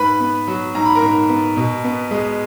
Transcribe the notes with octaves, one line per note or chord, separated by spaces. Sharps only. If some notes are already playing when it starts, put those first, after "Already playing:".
Already playing: G#2 B4 B5
B3
F#3
G#2 A#5
B5
A#4 A#5
G#2
B3
B2
B3
G#3